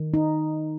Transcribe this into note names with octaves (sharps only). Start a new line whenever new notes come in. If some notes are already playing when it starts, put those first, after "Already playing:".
Already playing: D#3
D#4